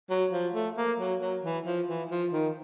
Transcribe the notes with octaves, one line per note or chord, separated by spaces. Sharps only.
F#3
F3
A3
A#3
F#3
F#3
E3
F3
E3
F3
D#3